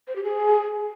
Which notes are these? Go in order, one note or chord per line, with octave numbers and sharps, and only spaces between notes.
C5
G4
G#4